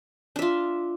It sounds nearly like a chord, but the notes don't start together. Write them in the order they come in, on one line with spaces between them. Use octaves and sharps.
D4 E5 F4